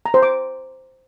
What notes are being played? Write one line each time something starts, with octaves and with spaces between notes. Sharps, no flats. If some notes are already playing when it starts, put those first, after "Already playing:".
A#5
C5
D6